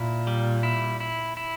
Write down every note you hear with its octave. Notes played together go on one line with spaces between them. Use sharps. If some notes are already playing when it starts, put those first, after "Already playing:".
Already playing: A#2 E4
G3
E4
E4
E4